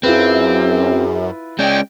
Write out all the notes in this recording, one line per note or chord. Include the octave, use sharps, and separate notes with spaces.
F#2 C4 E4 F4 G#4 B4
G#3 C#4 D5 G5